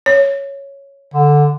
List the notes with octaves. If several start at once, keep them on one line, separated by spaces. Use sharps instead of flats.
C#5
D3